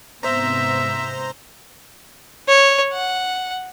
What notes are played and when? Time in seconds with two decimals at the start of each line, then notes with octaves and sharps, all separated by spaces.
0.23 G#2 C3 B3 C5 E5 A#5
2.48 C#5
2.93 F#5